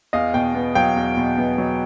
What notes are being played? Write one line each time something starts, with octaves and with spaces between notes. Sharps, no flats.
E2 D#5 F5
B2 F5 G5
B3
F#3 F5 G5
E2
B2
B3
F#3